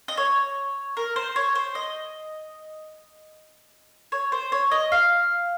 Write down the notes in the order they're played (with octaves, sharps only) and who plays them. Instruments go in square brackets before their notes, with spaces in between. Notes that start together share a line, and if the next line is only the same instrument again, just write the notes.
[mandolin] D#5
C#5
A#4
C5
C#5
C5
D#5
C#5
C5
C#5
D#5
F5